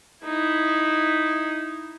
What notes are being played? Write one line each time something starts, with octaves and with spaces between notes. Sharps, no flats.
D#4 E4